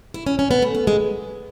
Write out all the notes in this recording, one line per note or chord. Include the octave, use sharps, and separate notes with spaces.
E4
C#4
C#4
B3
A3
B3
G#3